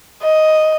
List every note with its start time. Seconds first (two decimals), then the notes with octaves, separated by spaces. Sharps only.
0.22 D#5